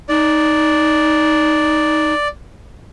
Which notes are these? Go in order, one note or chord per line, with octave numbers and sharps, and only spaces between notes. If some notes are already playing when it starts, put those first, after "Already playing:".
D#4 D5